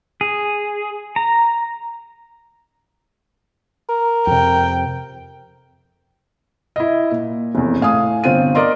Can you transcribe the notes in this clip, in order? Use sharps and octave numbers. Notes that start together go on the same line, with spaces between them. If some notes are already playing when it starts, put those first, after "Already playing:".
G#4
A#5
A#4
F2 C3 G5
E4 D#5
A#2
F1 E2
A2 F5 G#5 D#6
G1 C4 F4 D#7
A#4 D5 D#5 C6